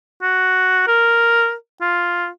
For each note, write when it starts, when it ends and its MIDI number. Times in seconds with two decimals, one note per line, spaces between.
0.23 0.84 66
0.87 1.53 70
1.81 2.27 65